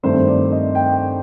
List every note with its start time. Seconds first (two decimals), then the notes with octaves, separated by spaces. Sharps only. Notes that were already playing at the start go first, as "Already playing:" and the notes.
0.03 G2 D#3 A3 C4 C5
0.27 D5
0.52 D#5
0.75 G5